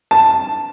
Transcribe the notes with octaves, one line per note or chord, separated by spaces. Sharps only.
A5